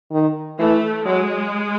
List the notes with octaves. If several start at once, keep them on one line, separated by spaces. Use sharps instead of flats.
D#3
E3 A3
F#3 G#3